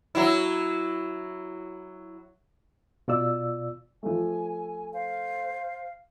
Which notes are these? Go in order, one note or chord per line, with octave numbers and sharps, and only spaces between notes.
F#3 E4
B2 F4 D5 E6
F3 A3 G#5
C5 F5